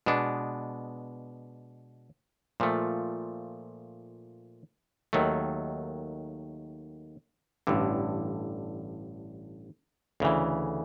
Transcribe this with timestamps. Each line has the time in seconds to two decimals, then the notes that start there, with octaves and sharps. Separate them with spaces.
0.06 B2 G#3 B3 D4
2.60 A#2 F3 A3
5.13 D#2 D#3 F#3 A3
7.67 A1 G2 D3
10.20 D2 C#3 E3